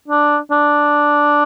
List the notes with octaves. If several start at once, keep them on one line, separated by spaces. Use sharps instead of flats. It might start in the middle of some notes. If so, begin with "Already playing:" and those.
D4
D4